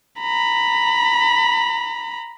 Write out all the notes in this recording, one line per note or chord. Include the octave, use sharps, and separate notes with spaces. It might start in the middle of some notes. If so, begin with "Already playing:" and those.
A#5 B5